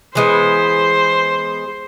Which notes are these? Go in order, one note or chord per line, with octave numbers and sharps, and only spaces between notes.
E3 G#3 B3 C5